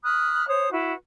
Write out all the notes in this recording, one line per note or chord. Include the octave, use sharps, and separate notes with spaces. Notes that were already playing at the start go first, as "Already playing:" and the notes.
B5 D#6 F6 F#6
C5 C#5 D#6
E4 F#4 B4